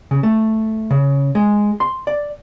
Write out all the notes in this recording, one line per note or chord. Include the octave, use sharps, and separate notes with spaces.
C#3
A3
C#3
G#3
C6
D5